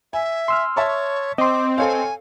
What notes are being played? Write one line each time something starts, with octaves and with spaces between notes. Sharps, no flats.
E5 G#5
C6 E6 F6
C#5 E5 A5 C#6
C4 D#5 C6 D6
A4 C#5 F5 G#5